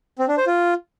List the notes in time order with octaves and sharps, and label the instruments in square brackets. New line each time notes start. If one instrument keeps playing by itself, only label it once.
[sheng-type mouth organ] C4
D4
C5
F4